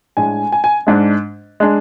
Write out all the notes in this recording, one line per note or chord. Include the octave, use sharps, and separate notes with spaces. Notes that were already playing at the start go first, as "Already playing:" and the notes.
A2 G#3 D4 G#5
G#5
G#5
G#2 G#3 D4
G#3 D4